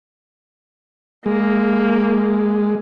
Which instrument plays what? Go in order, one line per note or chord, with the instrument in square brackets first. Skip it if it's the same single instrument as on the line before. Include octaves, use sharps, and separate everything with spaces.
[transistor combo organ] G#3 [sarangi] A#3